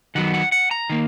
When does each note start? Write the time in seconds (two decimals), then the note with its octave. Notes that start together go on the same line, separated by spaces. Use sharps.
0.15 D#3 F#3 B3 F#5
0.34 F#5
0.52 F#5
0.71 A#5
0.90 D#3 A#3